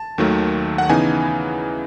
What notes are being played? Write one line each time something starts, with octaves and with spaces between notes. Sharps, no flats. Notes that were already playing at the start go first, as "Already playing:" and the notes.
Already playing: A5
D#2 D#3 F#3 A3
F#5
C#3 E3 B3 D#4 G#5